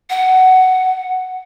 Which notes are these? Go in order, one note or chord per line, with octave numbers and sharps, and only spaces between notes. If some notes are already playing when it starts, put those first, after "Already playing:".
F#5